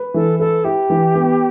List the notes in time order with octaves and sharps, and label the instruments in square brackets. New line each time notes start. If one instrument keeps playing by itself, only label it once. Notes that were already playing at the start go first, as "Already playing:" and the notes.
Already playing: [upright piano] B4
[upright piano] E3 [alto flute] A4
[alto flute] A4 [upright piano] B4
[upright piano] E4 [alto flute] G4
[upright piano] E3
B3